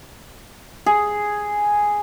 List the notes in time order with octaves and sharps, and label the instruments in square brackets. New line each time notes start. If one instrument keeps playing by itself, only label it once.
[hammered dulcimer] G#4